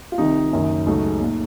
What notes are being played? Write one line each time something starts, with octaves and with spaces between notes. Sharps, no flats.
F4
C2 C3 D#3 D#4
F#1 F#2 D#3
C#2 C#3 F#3 A3 D#4
A#2 A3